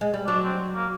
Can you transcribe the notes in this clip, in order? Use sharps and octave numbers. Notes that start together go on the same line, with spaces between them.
G#3
G3
F#3 D4
C4
A#3